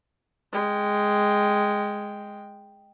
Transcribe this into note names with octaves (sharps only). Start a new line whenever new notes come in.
G#3 G5